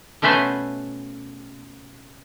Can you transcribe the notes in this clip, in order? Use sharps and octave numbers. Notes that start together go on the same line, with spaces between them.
B2 A3 C#4 B4 C5 E5